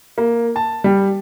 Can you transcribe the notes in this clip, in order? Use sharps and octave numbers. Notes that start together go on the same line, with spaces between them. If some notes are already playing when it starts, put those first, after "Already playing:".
A#3
A5
G3